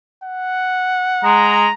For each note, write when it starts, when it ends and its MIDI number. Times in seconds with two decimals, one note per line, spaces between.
0.24 1.61 78
1.24 1.67 56
1.24 1.74 82